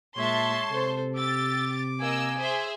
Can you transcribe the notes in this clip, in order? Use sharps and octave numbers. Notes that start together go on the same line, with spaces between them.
A#2 G#3 C#5 E5 A5 C6
C3 A4 C5
G4 D6 E6 A6
A#3 D#5 G#5 E6
G#4 C5 E5